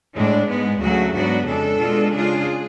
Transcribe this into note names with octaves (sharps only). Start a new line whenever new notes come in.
A2 G#3 D4
G#2 G#3 B3
D2 C#3 F#3 A3 F#4
G#2 F#3 B3 D4 F#4
F2 C#3 G#3 D4 A4
B2 G#3 D4 F4
C#3 G#3 D4 F4 G#4